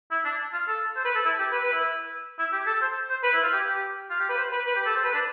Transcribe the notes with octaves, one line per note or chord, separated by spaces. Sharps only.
E4
D4
F4
A4
C5
B4
A4
E4
G4
B4
B4
E4
E4
G4
A4
C5
C5
B4
E4
F4
G4
G4
F4
G4
B4
C5
B4
B4
G4
A4
C5
B4
D4